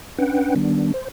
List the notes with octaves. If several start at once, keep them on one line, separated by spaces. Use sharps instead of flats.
C#4 D4 B4 F#5 G5
D#3 G3 B3 D4
C5